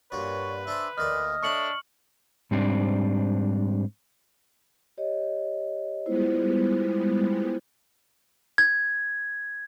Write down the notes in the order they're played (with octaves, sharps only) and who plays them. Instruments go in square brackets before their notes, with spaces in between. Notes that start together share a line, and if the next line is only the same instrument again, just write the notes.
[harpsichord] G2 A#2 F#4 [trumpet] B4 [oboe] C#5
[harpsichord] D4 G#4 C5 [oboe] E5
[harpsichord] D2 A#2 D5 [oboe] D#5 [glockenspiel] F6
[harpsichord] A3 C#5 [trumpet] D4 [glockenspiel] C#6 C#7 F#7
[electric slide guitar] G#2 G3 C4 D4
[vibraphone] G4 C#5 D#5
[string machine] G3 G#3 B3 [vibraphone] E4 F4 C5
[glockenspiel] G#6